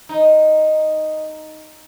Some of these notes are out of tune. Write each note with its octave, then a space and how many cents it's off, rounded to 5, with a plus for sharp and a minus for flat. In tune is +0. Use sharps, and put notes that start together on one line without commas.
D#4 -5